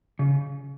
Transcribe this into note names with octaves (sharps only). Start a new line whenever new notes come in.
C#3